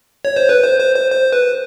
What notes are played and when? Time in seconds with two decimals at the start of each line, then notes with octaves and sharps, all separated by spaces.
0.25 C#5
0.36 C5
0.49 B4
0.64 C5
0.80 C5
0.95 C5
1.11 C5
1.32 B4